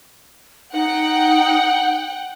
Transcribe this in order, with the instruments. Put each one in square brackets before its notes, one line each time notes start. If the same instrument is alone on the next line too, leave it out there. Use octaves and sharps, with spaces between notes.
[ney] D#4 [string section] F#5 G5